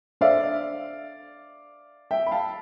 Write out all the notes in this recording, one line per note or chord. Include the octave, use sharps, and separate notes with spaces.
D4 A4 C5 D5 E5 F5
E5 G5
B5
F5 A5